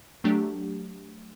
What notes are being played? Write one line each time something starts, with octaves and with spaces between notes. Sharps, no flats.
F#3 A3 D4 G4